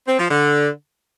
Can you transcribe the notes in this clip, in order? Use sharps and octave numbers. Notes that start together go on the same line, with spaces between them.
C4
F3
D3